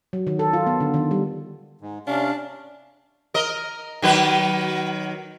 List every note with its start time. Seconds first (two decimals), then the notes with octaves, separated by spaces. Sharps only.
0.13 F#3
0.27 D#3
0.39 A4
0.53 F4
0.67 B3
0.80 D3
0.94 D#3
1.11 G3
1.81 G#2
2.07 C3 C#4 D4 F5
3.34 A#4 D#5
4.02 D#3 F#3 B4